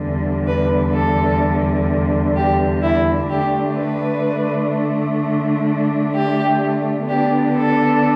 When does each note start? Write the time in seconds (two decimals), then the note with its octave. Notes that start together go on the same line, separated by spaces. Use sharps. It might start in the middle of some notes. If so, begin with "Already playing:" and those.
Already playing: E2 D3 G3
0.47 B4
0.93 A4
2.35 G4
2.82 E4
3.29 D3 A3 D4 G4
3.78 B4
6.14 G4
7.08 D3 B3 D4 G4
7.56 A4